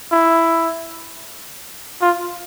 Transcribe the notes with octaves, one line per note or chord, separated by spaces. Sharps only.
E4
F4